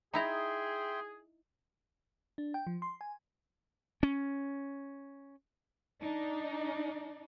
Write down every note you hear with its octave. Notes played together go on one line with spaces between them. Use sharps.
D#4 E4 G#4 E5 G5 A#5 C6
D4
G5
F3
C6
G#5
C#4
D4 D#4